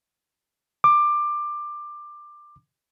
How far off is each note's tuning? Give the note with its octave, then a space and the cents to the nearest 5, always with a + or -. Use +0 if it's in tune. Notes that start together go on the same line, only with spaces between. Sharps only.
D6 +20